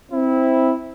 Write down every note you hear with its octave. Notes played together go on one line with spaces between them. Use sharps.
C4 E4